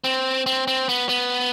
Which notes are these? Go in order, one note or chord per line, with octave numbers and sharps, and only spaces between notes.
C4
C4
C4
B3
B3